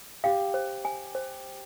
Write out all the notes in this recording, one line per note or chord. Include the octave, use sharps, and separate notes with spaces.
G4 F5
C5
G#5
C5